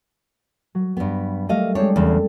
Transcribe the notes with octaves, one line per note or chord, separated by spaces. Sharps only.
F#3
G2 B3
G3 A3 A#4 D#5 F5
G#3 C4 D4 C#5
E2 C#3 A4